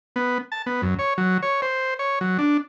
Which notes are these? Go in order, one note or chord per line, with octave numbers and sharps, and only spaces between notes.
B3
A5
B3
F#2
C#5
F#3
C#5
C5
C#5
F#3
D4